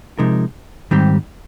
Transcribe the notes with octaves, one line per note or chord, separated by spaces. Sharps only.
C3 F3 G#3 D#4 A#4
G#2 D#3 G3 C4 G4